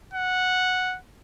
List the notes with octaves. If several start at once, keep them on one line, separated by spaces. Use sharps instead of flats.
F#5